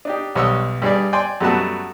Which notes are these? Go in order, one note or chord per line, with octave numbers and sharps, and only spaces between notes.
D4 D#4 G4
B1 G3 C#5 D#5 F#5 E6
G2 G3 G#4 D5
D5 G5 G#5 C6
F#2 G3 A3 B3 F#4 A5